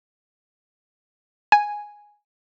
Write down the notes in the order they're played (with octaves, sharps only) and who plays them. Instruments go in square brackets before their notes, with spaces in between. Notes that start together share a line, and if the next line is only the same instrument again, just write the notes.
[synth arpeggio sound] G#5